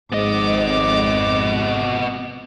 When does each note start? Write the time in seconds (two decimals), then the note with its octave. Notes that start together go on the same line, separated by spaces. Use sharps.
0.12 G#1 F2 G#2 B3 D#5 D6